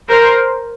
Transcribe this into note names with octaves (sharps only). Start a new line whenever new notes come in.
A#4 C5